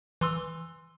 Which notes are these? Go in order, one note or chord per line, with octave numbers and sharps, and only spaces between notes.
E3 C6 E6